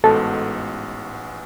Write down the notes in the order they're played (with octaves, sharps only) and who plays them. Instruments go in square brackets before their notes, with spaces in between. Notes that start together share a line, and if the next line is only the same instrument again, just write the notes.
[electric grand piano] A1 G#2 G#3 B3 F#4 [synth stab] A4